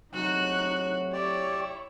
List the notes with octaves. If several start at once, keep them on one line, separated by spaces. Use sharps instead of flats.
A2 C3 F#3 D#4 F#4 F#6
E4 G4 C#5 D5